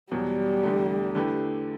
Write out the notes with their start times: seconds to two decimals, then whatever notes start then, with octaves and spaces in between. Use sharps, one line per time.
0.11 E2 B2 F#3 G3
0.63 E2 D3 A3
1.15 D3 A3 E4 G4 B4